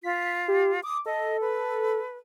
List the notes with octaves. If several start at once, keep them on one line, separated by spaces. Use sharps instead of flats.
F4 B6
G4
D6 D#6
A4 D#5
B4